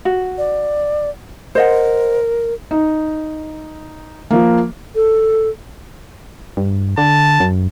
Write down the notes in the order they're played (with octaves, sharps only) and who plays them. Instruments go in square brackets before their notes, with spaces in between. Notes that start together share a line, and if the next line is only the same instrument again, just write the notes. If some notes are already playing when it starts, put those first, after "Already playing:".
[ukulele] F#4
[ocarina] D5
[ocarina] A#4 [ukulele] C5 D#5 F#5
[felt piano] D#4
F3 A#3
[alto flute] A4
[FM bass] G2
[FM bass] D3 [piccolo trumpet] A5
[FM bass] F#2